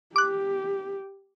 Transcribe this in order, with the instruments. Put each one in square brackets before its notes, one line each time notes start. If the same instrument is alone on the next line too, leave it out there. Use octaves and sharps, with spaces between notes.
[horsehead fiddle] G4 [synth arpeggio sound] D6 F#6